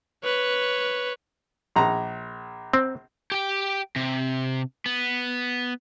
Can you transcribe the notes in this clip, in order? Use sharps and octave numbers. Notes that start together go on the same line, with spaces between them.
B4 C#5
A#1 A#5
C4
G4 G5
C3
B3